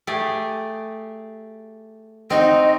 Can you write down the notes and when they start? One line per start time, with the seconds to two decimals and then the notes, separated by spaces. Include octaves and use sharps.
0.07 A3 G4 G#4
2.30 C4 D#4 F#4 D#5